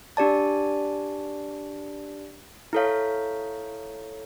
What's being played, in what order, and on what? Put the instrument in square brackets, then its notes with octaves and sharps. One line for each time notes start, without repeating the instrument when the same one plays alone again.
[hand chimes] D4 G4 D5 A5
E4 A4 C#5 F5